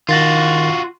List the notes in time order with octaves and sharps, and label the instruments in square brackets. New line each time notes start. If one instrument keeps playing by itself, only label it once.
[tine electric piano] D#3 A6 A#6 [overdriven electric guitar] F4 F#4